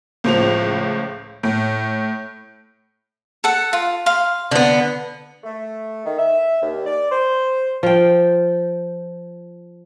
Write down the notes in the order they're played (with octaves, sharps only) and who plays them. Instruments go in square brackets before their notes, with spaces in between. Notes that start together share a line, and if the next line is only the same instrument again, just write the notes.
[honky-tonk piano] C#2 A2 F3 F7
A2
[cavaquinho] A4 F#5
F4
F5 C6
[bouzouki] D3 B3
[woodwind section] A3
D#3
E5
D#2
D5
C5
[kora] F3 G5